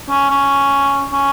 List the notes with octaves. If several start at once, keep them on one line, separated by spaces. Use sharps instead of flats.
C#4
C#4
C#4